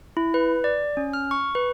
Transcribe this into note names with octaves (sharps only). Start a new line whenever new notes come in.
E4
B4
D5
C#4
F6
C#6
B4